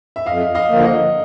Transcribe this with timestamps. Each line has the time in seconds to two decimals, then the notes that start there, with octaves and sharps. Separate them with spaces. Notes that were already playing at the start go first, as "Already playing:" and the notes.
0.16 E5
0.26 F2 D#5 F5
0.55 D#5 F5
0.69 D3 F3 A#3
0.79 F#5
0.85 D#5 F5